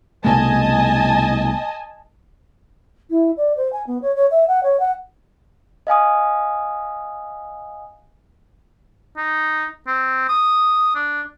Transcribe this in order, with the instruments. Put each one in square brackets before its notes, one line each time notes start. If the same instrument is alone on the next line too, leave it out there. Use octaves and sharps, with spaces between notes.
[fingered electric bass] C2 B2 A3 [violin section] D#5 G#5 A5
[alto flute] E4
D5
C5
G#5
B3
C#5
C#5
E5
F#5
C#5
F#5
[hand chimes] D#5 F5 G#5 D#6
[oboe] D#4
C4
D#6
D4